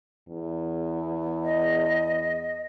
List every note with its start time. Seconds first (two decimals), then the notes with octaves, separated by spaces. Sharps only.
0.28 E2
1.43 D#5